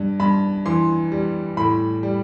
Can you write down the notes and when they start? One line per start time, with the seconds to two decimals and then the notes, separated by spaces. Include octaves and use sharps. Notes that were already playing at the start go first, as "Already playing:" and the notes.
Already playing: G2
0.20 G2 B5
0.66 E3 C6
1.12 G3
1.57 A2 B5
2.03 G3